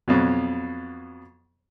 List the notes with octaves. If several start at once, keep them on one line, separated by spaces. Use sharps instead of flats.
F2 B2 F#3